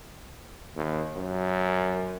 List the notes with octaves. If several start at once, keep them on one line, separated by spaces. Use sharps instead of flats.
D#2
F#2